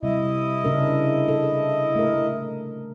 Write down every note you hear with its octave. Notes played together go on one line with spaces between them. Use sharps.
C3 G3 E4 D#5
C#3 D4 A#4
A4
A3 A#4